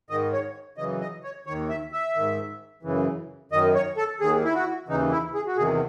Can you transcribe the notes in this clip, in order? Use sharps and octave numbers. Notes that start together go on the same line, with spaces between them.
G#2 D#3 D#5
C#5
F#2 C#3 E3 D#5
D#5
C#5
D#2 D#3 C#5
E5
E5
G#2 D#3
F#2 C#3 E3
F#2 D#3 D#5
C#5
A4
D#2 D#3 G#4
E4
F#4
D#2 C#3 E3 D#4
E4
G#4
F#4
E2 C3 D#3 G#4